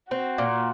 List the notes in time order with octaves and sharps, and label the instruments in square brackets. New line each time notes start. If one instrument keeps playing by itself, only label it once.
[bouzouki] C4 [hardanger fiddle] F#4
[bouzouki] A#2